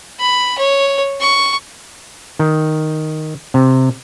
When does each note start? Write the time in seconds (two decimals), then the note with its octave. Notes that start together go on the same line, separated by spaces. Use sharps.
0.20 B5
0.58 C#5
1.20 C#6
2.39 D#3
3.54 C3